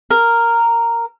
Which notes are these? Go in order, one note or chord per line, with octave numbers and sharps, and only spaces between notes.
A#4